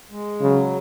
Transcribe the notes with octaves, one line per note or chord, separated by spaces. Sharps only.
G#3
C#3 F#3